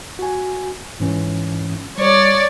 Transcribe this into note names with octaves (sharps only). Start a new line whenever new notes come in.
F#4 G#5
G#2 E3 C#4
G3 C#5 D5